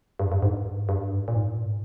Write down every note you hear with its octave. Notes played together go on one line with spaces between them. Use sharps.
G2
G2
G#2
G2
G2
G#2
A#2
G#2
A#2
G#2